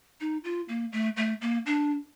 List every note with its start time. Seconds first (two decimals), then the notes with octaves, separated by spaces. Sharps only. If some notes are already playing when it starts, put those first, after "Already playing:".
0.21 D#4
0.44 F4
0.69 A#3
0.92 A3
1.17 A3
1.41 A#3
1.66 D4